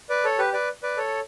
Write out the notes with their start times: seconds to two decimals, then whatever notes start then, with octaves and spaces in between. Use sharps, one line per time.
0.10 B4 D5
0.25 A4 C#5
0.39 G4 B4
0.53 B4 D5
0.83 B4 D5
0.97 A4 C#5